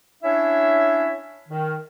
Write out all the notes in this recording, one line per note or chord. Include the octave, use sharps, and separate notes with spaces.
C#4 D4 E4 C#5 E5
D#3